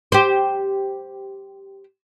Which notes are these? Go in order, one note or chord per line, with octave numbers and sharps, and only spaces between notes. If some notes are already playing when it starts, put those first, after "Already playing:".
G4 C5